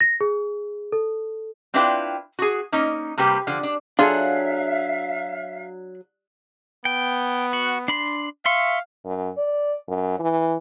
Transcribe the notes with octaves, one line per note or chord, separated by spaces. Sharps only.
A#6
G#4
A4
C4 D4 E4 F4 B4 G5
F#4 G#4
A#3 C#4 D#4
C3 G3 A#3 C4 G4 B4
D3 F3
D4
F#3 D4 F4 G#4 A4 E5 F5
B3 G5
F#4
D4 B5 C6
E5 F5 C6 C#6
F#2
D5
F#2
E3